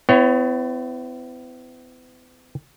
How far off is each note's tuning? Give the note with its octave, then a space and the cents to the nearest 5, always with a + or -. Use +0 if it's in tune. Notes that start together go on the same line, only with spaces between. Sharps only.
B3 +45 E4 +15 C#5 +5